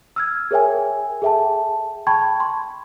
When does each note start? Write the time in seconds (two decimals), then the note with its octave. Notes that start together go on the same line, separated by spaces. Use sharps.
0.16 E6 F6 G#6
0.51 G#4 A#4 C#5 E5 G5 G#5
1.22 G#4 A4 E5 G5 A5
2.07 G5 A5 B5 C#6 G#6
2.40 C6